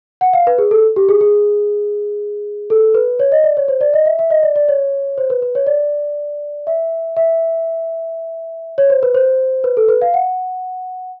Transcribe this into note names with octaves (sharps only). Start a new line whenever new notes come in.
F#5
F5
B4
G#4
A4
G4
G#4
G#4
A4
B4
C#5
D#5
D5
C#5
C5
D5
D#5
E5
E5
D#5
D5
D5
C#5
C5
B4
B4
C#5
D5
E5
E5
C#5
C5
B4
C5
B4
A4
B4
F5
F#5